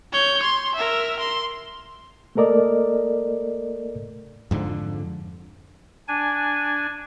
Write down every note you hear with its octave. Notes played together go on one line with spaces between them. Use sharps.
C#5 G6
C6
A#4 E5
C6
A3 A#3 A4 A#4 D5 D#5
F2 G#2 D3 F3
D4 G#5